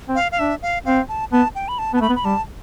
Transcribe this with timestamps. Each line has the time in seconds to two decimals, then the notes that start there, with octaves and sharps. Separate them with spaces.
0.08 C4
0.15 F5
0.32 F5
0.39 D4 E5
0.62 F5
0.85 C4 F5
1.09 A5
1.32 B3 A5
1.55 G5
1.68 B5
1.79 A5
1.93 B3
1.96 A5
2.01 A3 B5
2.09 B3
2.15 B5
2.25 G3 A5